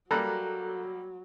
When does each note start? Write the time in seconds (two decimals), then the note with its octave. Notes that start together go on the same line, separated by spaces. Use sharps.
0.11 F#3 G3 A#3 A4 A#5 F#6